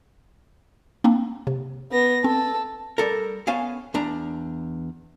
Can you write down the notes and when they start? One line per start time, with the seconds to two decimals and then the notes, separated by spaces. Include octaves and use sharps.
1.04 A#3 C4 D4
1.47 C3
1.91 B3 A#6
2.24 C4 A4
2.98 G3 A4 A#4
3.47 B3 C#4 F5 G#5 A5
3.94 E2 D4 A#5